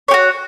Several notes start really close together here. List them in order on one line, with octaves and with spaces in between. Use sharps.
C#5 G4 F#4